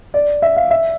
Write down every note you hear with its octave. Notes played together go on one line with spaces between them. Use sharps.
D5
E5
F5
E5